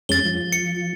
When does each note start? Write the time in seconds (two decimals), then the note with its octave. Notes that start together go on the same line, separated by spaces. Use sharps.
0.09 F2 G#3 C#4 A6 G7
0.25 F3
0.52 C#7